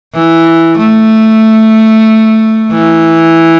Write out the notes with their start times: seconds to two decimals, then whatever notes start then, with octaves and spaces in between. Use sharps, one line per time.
0.14 E3
0.78 A3
2.71 E3